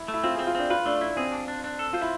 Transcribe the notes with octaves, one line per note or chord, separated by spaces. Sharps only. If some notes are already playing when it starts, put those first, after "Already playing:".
Already playing: E4
A3
E4
C4 F4
C4 G#4
F4
C4 D4
F4 B4
A3 D4
D4 E4
C4 G#4
D4
D4
D4
A4
F4 C5
E4